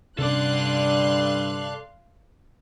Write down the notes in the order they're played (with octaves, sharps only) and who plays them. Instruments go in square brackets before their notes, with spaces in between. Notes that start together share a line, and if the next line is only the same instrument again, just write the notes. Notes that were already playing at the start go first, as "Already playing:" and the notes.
[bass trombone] G2 [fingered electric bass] C3 C#4 [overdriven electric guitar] A4 D5 [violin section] F5 C6 F#6